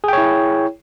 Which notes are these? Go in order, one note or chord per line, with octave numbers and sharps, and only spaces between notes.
E4 G#4 C#5 G5